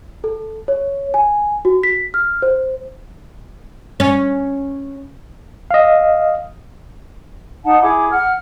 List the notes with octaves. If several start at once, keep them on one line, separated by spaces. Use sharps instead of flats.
A4
C#5
G#5
F#4
B6
F6
C5
C#4
D#5 F5
D#4 F#5 A5
E4 G#4 D6
F#5 F6